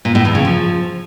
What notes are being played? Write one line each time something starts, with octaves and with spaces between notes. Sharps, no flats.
A#2
A2
E2
C#3
F3